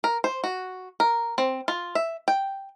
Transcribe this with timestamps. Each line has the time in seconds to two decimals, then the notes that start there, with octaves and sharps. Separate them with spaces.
0.04 A#4
0.24 C5
0.44 F#4
1.00 A#4
1.38 C4
1.68 F4
1.95 E5
2.28 G5